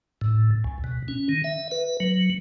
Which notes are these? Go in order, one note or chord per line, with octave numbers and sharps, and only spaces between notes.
A2
C#2
B2
C#4
D#3
E5
B4
F#3